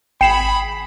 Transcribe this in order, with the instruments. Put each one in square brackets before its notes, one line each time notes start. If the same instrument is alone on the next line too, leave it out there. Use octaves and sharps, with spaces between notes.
[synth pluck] G#1 C7 C#7 [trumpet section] G#4 B5 [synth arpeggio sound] G5 E7